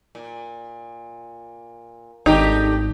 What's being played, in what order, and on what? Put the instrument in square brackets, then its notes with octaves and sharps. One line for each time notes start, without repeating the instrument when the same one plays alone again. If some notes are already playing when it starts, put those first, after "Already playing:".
[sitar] A#2
[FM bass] G#1 [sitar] A3 D4 G4 [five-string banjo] D#4